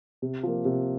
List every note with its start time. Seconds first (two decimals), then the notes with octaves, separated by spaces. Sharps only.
0.22 C3
0.43 F3 A#3
0.65 C3